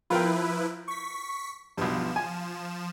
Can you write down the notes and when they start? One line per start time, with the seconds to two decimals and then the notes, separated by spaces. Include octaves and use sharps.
0.10 F3 E4 F4 A#4 B4 G5
0.88 C#6 B6
1.77 B1 G2 F3 E7
2.16 G#5